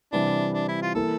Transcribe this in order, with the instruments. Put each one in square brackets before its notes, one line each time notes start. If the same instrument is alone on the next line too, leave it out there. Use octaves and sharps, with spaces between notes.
[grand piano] C3 E3 G3 [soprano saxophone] D4
[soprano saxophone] D4
E4
F4
[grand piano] E3 A#3 E4 [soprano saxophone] A4